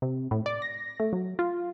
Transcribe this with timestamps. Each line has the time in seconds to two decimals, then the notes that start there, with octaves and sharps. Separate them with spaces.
0.02 C3
0.31 A2
0.46 D5
0.62 A#6
1.00 A3
1.13 F#3
1.39 F4